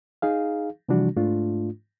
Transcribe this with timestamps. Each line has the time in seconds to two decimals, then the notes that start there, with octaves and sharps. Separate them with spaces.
0.22 D#4 G#4 F5
0.89 C3 E3 F3 G3 D4 F#4
1.16 G#2 A3 D4 F4